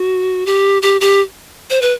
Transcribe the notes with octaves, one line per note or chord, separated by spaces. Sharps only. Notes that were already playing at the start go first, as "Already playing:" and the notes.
Already playing: F#4
G4
G4
G4
C5
B4